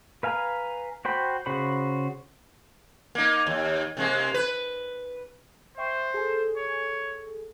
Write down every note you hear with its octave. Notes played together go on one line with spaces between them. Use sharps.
B4 F5 G#5 A#5
F#4 C5 G5 B5
C#3 F#4 C5 B5
A#3 D#4
D#2
C3 G#3 A#3
B4
C5 E5 G5 C#6
G#4 A4 G#5
C#5